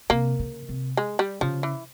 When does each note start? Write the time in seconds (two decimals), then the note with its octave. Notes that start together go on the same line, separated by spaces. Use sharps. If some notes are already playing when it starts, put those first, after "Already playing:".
0.10 C3 A#3
0.39 C#3
0.69 C3
0.97 G#3
1.19 G3
1.41 C#3 F3
1.63 E3